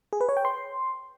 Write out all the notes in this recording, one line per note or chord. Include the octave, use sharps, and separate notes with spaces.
G#4
B4
C#5
G5
C6